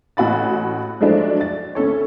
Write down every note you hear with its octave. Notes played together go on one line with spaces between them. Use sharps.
A1 F#4 B5 A6
F3 F#3 G#3 A3 D4
A6
D2 C#4 A4 C#5